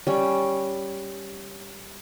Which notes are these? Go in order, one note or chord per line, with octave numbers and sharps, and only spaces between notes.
G3 C#4 C#5